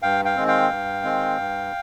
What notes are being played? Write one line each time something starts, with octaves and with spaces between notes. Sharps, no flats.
G2 F5 G5
F5 G5
D#3 G#3 C4
F5 G5
G2
D#3 G#3 C4
G2